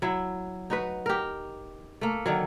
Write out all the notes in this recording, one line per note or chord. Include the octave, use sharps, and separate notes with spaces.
F#3 E4
D#4 F#4 B4
G4 A#4
A3 A#3
D3 D#3 F#3